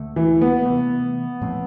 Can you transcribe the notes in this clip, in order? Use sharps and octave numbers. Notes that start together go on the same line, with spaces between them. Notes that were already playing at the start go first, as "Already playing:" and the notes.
Already playing: D2 D3 A3
E3
B3
C3 E3 A3
A2 F3 A3 C4